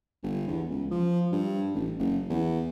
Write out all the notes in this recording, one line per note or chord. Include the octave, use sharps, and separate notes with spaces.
G1
E2
C#2
F3
G2
A1
F#1
E2